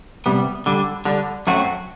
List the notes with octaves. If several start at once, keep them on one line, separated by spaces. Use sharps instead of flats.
C3 G3 B3
D3 G3 D4
D3 G3 D4
F#2 F#3 A3 C4 F#4